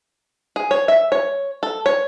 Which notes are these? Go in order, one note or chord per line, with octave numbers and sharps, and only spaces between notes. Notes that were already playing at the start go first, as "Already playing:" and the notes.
G#4
C#5
E5
C#5
A4
C#5